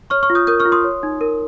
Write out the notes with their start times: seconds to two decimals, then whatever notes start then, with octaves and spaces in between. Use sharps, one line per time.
0.10 C#5 C#6 F6
0.23 C#6 F6
0.30 F4
0.35 D#6 G6
0.47 A#4 D#6 G6
0.60 C#6 F6
0.65 F4
0.72 C6 D#6
0.84 C#5
1.03 D#4
1.21 A#4